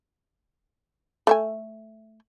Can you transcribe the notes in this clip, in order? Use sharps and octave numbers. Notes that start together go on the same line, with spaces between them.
A3 E5 G#5